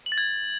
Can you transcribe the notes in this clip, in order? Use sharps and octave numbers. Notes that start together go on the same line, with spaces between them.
F#7
A6
G#6